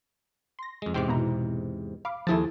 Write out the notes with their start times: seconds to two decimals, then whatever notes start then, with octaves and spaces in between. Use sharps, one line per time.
0.59 C6 A#6
0.82 F2 G#3
0.94 E2 G#2 C3 G5 C6 D6
1.08 B2 E4 A#5
2.05 F5 B5 D6
2.27 D#2 F3 E4 G#4 A4 A5